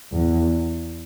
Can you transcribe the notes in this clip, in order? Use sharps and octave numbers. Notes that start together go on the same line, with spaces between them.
E2